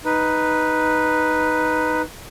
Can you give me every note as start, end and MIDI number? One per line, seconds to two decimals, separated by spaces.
0.05 2.02 63
0.05 2.02 71